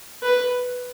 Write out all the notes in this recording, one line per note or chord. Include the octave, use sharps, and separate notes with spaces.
B4